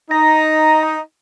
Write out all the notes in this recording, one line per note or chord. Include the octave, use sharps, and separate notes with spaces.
D#4 A#5